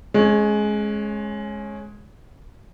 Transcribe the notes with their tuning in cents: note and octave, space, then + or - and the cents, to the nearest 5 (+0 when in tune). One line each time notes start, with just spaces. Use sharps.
G#3 +15 C#4 -15